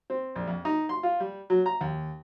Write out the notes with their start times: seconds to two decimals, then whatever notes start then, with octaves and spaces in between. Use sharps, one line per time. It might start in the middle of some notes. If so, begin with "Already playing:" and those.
0.10 C4
0.36 A#1
0.47 F2
0.65 D#4
0.89 C6
1.03 F4
1.20 G3
1.50 F#3
1.66 A#5
1.81 D#2